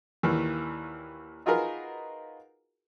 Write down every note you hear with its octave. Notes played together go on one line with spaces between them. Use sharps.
D#2 A#2 D#3 E3
D#4 F4 F#4 G#4 A#4 B4